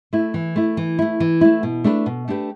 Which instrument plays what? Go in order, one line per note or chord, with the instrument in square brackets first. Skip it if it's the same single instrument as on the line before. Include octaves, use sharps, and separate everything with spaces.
[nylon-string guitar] A3 E4
E3
A3 E4
E3
A3 E4
E3
A3 E4
B2
A3 D4 G4 B4
B2
A3 D4 G4 B4